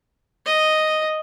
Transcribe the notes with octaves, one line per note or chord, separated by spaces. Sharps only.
D#5